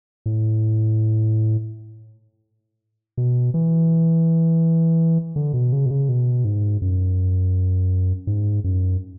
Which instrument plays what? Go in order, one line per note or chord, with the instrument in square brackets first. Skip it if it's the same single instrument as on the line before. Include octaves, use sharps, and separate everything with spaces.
[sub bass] A2
B2
E3
D3
B2
C#3
B2
C#3
B2
G#2
F#2
G#2
F#2